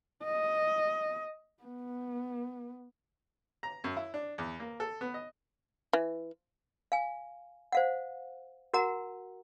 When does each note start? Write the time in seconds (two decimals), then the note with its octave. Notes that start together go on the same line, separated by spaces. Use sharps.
0.24 D#5
1.63 B3
3.63 A#5
3.84 F#2
3.97 E4
4.14 D4
4.38 E2
4.60 A#3
4.80 A4
5.01 B3
5.14 D#5
5.93 E3
6.92 F5 G#5
7.72 C5 F5 F#5
8.74 F#4 A#4 F#5 A#5